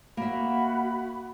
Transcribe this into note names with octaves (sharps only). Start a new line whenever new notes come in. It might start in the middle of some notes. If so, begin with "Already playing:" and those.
A#3 F#4 E5 B5